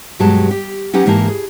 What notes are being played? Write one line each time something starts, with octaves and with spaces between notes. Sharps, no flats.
G2 B2 F#3 G#3 G4 A5
G4
F#3 C#4 D#4 G4 B4 F#5
G#2 E3 A#3 G4 A5
G#4